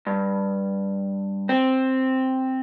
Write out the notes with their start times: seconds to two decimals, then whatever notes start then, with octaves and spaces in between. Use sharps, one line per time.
0.07 G2
1.49 C4